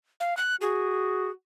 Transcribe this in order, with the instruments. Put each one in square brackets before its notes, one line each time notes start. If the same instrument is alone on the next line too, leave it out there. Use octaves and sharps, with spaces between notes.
[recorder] F5
F#6
[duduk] F#4 [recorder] G#4